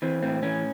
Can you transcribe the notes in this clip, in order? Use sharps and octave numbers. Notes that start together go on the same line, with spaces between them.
E3 C4
A2 C4
E3 C#4